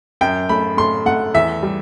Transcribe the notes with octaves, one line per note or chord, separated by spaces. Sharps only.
F#2 G5
A3 B5
A3 C6
A3 F#5
E2 E5
G3